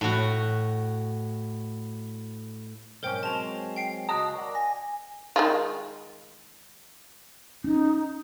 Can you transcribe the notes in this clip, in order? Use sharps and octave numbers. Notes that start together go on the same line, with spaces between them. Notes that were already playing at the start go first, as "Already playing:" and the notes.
A2 F#4
B1 G#2 C#4 A#4 C5 G5
F#3 G#3 C4 A5 F7
G5 C7 D7
C#2 F#4 D#5 A5 D#6
A#4 D5 F#5
G#5 A#6
D#3 G#3 F4
C#4 D#4